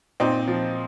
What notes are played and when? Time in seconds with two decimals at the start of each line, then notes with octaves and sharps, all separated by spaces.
0.20 A#2 C4 D#4
0.48 F3